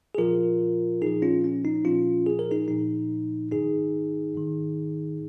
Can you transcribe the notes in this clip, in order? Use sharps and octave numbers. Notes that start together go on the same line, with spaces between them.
G#4
A#2 F3 F4 A#4
A#2 F3 D#4 G#4
C#4 F4
C#4
D#4
A#2 F3 C#4 F4
G#4
A#4
D#4 G#4
A#2 F3 D#4
G#2 D#3 D#4 G#4
G#2 D#3